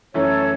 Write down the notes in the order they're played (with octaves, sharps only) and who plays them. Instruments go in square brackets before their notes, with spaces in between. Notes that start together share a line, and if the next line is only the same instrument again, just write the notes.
[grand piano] F#2 E3 A3 C#4 [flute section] A4 C#5